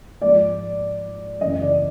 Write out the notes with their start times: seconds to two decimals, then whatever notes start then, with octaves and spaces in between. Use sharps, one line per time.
0.21 G#2 F3 D5
1.41 F#2 C#3 E3 D#5
1.62 D5